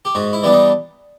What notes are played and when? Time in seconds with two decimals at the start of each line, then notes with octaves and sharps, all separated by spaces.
0.05 G4
0.15 G#2 F#4
0.33 E4
0.43 E3 G3 B3 D4
0.52 D#4